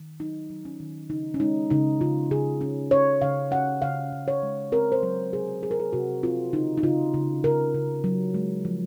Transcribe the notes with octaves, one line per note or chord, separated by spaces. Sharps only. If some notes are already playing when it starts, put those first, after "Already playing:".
Already playing: D#3
F#3 D#4
F#3
C#4
D#3
C#3 D#4
C#4
G#3 D#4
C#3 D#4
C#3 F4
C#3 G#4
C#4
C#4 C#5
C#3 F5
C#4 F#5
C#3 F5
C#3
C#5
G#3
C4 A#4
C5
F#3 A#4
C3 G#4
C4 G#4
A#4
G#4
C3 F#4
C4 F4
C#3 D#4
D#4
C#3 F4
C#3
C#3 A#4
C#3
F#3
G#3
F3